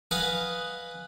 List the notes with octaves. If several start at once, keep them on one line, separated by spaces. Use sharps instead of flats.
B4 D#5 F5 F#5 G#5